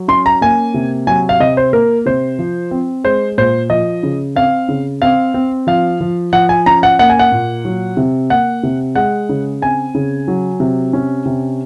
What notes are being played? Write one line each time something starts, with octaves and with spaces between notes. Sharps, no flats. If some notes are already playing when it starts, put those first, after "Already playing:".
Already playing: F#3
C#4 C6
A#5
A#3 G#5
C3
F#3 G#5
F5
C3 D#5
C5
A#3 A#4
C3 C5
F3
C4
G#3 C5
A#2 C5
F3 D#5
C#3
C4 F5
C#3
C4 F5
C4
F3 F5
F3
F3 F#5
G#5
C#4 A#5
F#5
A#3 F#5
G#5
F#5
A#2
F#3
C3
A#3 F#5
C3
G#3 F#5
C#3
C4 G#5
C#3
F#3
C3
C#4
C3